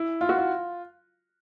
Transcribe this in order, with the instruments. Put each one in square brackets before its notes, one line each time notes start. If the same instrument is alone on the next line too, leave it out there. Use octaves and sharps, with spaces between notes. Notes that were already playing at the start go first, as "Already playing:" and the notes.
Already playing: [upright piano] E4
F4
F#4
F4